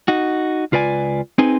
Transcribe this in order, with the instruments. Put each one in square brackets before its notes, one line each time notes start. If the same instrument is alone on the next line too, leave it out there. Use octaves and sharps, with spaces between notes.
[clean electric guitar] D#4 F#4
C#2 F4 B4 D5 G#5
C4 D#4 G#4 B4 G#5 C6